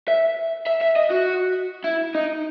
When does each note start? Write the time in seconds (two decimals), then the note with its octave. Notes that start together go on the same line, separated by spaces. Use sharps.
0.08 E5
0.67 E5
0.82 E5
0.96 D#5
1.11 F#4
1.84 E4
2.15 D#4